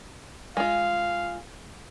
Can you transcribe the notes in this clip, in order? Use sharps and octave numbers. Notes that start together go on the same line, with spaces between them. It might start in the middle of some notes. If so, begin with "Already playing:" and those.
G#3 F4 F5